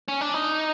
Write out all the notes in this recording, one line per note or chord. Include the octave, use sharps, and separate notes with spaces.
C#4
D4
D#4